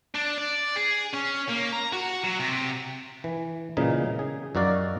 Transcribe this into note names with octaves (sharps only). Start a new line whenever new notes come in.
D4
D5
G#4
C#4
A#3
A#5
F#4
F#3
C3
E3
A#2 C#3 E3 D#4
G#4
F#2 D#4 F#4 D5 F5